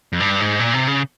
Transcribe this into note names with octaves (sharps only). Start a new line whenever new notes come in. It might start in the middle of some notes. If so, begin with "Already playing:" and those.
F2
G2
G#2
A#2
C3
C#3